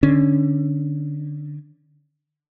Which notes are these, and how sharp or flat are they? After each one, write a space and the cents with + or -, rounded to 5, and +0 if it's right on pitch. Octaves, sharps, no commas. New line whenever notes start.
D3 +15 C#4 +0